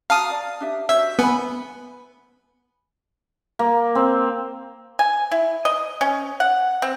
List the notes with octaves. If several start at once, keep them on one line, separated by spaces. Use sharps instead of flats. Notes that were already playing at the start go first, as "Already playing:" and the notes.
F#4 F5 A5 A#5 D#6
D5
D4 G4 E5
F#4 C5 C#5 E5
B3 G#5 B5
A#3
C4
G#5
E4
D#5
C#4
F#5
C4